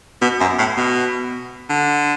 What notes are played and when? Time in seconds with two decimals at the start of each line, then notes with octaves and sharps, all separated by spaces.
0.22 B2
0.40 F#2
0.58 A2
0.77 B2
1.70 D3